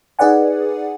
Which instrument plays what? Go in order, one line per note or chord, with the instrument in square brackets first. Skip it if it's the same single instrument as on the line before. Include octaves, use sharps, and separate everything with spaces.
[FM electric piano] D#4 G#4 B4 D5 F#5 G#5